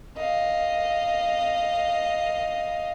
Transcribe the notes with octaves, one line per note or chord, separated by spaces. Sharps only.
D#5 F5